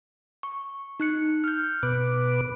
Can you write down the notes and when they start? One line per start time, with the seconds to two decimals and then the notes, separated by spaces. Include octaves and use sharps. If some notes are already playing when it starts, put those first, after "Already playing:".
0.43 C#6
1.00 D#4 F#6 C#7
1.44 F6 G6
1.83 B2 B4 D6 F#6